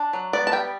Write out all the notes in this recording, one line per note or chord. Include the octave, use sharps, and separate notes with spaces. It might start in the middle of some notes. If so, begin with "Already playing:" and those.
Already playing: D4
F#3
B3 D5
A5
G3 G5